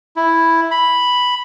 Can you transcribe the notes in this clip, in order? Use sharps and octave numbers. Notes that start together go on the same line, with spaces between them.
E4
B5